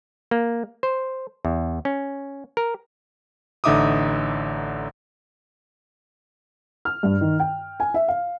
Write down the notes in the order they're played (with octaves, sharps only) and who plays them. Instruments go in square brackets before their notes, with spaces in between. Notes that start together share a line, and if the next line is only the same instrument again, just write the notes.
[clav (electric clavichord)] A#3
C5
E2
C#4
A#4
[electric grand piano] A1 D3 D#4 E5 D6 D#6
[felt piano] F6
G2
D#3
G5
G#5
E5
F5